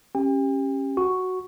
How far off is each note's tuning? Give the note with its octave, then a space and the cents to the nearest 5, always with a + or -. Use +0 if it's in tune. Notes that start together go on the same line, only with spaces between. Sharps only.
C#4 -25 G4 +0 G5 +45
F#4 +0 C#6 +0